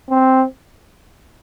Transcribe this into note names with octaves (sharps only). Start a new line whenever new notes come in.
C4